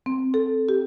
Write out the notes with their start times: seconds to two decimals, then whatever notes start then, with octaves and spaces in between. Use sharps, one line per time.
0.06 C4
0.34 A4
0.69 G4